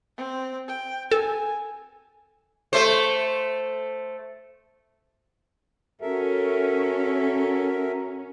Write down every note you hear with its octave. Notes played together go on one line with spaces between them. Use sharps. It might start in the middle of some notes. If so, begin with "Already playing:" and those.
C4
G5
A4 G#5
A3 C5
C#4 F#4 A4 A#4 E5